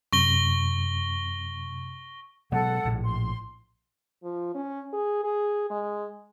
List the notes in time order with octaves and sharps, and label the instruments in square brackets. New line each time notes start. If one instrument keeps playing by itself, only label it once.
[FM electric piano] F#2 C3 [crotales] C#6 A#6 G7
[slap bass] B2 F#3 G#3 [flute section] A4 F#5
[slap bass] A#1 A2
[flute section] C6
[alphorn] F3
C#4
G#4
G#4
G#3